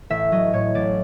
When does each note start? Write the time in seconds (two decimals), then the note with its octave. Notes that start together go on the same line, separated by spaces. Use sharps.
0.10 A1 E5
0.32 F#3 D#5
0.53 A2 C#5
0.75 A1 D5